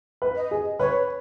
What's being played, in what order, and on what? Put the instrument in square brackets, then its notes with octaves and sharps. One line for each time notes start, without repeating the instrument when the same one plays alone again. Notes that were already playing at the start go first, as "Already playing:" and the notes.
[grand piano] B4
[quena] D#5
[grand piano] G#4
[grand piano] B4 [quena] C#5